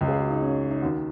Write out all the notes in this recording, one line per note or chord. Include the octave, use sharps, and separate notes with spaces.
C#2 C#3
G#4
F#4
D#4
C#4
D#4
D#2 D#3 F#4